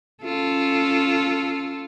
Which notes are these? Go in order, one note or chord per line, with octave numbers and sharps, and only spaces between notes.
C#4 F4 A4